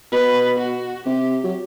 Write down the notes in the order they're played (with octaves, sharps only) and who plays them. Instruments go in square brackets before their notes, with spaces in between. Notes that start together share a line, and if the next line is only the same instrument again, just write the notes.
[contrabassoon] B2 [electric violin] B4
[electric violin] F#4
[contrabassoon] C3 [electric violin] G4
[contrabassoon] F#3